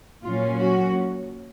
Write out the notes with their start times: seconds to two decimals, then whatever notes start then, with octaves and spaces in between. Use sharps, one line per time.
0.25 A#2 F#3 A#3 C#4 F4
0.59 F#4